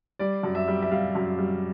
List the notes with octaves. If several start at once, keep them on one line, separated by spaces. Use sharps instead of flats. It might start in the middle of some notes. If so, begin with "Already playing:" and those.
G3 D5
F#2
E5
G3
E5
G3 F5
F#2
G3